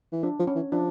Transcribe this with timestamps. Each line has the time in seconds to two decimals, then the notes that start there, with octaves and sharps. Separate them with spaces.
0.12 E3
0.23 F3 D4
0.39 F3
0.47 C#4
0.55 E3
0.72 F3 D4